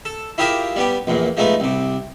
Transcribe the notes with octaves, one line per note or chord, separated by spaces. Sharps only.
A4
E4 F4 G4 G#4 A#4 E5
G3 B3 G4
A#1 E2 A#2
F3 G#3 A3 B3 D#4
C2 C3